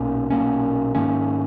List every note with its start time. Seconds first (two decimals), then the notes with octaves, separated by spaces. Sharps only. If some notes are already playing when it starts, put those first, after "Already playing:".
Already playing: B1 A#2 A#3 C#4
0.30 B1 A#2 A#3 C#4
0.95 G#2 D#3 A#3 C#4